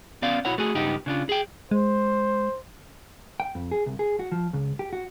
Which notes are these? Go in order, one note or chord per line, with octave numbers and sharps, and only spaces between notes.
B3 C#4 D5 F5
B1 E4 F#4 C#5 F#5
A3 F#4 G#4
C#2 G2 B3 D#4 G4
C#3 D4 F4
G#4 G5
G#3 C5
G5
F2
G#4
C2
G#4
F#4
F3
C#2
G4
F#4